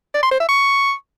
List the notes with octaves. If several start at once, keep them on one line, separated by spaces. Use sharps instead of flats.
D5
C6
C5
E5
C#6